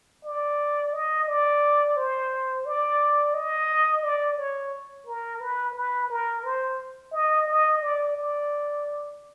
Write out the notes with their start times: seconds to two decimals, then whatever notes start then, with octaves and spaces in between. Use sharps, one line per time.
0.25 D5
0.93 D#5
1.28 D5
1.97 C5
2.66 D5
3.34 D#5
4.03 D5
4.38 C#5
5.06 A#4
5.41 B4
5.75 B4
6.10 A#4
6.44 C5
7.13 D#5
7.48 D#5
7.82 D5
8.16 D5